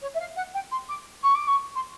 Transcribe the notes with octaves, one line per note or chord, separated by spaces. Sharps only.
C#5
E5
F5
F#5
G5
C6
D6
C#6
D6
C#6
C6